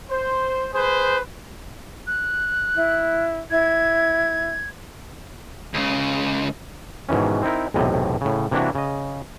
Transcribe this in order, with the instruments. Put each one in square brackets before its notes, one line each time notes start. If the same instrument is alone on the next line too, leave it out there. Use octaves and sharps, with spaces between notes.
[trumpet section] C5
G#4 B4 C5
[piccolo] F#6
[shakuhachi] E4
[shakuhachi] E4 [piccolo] G#6
[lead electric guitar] C#2 C#3
[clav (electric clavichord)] G#2 B2 D#3 E3 C#4
C4 D#4 E4 A#4
B1 E2 A2 C3 D#5
A2 C#3
C3 E3 A#3 D4 E4 F#4
C#3 D#5